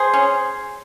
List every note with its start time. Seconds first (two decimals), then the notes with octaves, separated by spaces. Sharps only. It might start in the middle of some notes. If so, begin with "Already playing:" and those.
Already playing: G#4 C5
0.14 C#4